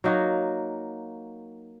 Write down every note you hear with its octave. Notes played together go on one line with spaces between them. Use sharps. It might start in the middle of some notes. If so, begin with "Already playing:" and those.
F#3 A#3 D#4 F#4